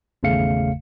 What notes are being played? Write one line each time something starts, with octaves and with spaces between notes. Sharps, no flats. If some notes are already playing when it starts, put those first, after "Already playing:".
G#1 E2 C#3 A3 F5 C#7